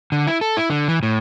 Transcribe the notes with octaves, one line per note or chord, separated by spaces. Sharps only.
D3
E4
A4
E4
D3
E3
A2